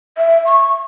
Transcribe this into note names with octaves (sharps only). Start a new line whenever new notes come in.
E5
C#6